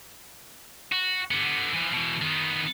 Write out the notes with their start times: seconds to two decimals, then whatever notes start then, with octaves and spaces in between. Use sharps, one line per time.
0.92 F#4
1.31 D3 B3
1.74 E3 F3
1.93 B2 E3
2.22 D#3 B3